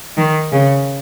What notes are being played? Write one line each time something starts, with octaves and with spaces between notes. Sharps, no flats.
D#3
C#3